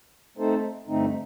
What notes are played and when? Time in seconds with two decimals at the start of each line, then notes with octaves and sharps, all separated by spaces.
0.37 A3 C4 D#4 A4 C5
0.88 G2 D3 A3 C4 D#4